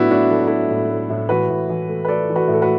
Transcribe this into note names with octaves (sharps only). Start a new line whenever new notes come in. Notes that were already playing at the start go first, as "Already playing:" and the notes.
Already playing: A2 F#3 B3 D4 E4 F#4
A2 D4 F#4
F#3 A4
F#4
A3 E4 A4
A2
A3
A2
E3 F#4 B4
A2
E3
A3
B4
A3 A4 D5
E3
F#4 B4
A2
A4
F#4 B4